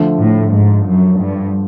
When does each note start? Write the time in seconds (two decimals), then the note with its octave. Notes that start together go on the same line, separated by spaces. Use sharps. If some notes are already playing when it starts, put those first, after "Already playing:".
Already playing: D3 F3 A3
0.18 A2
0.52 G#2
0.85 F#2
1.20 G2